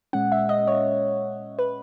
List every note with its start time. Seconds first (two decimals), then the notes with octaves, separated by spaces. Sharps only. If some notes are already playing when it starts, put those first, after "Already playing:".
0.13 A#2 G#3 C#4 F#5
0.32 E5
0.49 D#5
0.67 C#5
1.59 B4